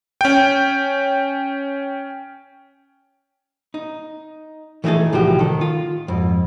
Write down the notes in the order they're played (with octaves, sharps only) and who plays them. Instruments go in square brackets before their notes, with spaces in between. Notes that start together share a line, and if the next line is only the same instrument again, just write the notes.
[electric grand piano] C#4 G5
[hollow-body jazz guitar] D#4
E3 A3 D#4 E4 G#4 A4
C2 A2 F3 F#4 G4
D#3 A4
F4
F2 G#2